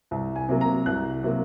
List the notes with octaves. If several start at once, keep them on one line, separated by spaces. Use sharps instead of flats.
C2
G#5
C3 F#3 A#3
A#5
C2 F#6
C3 F#3 A#3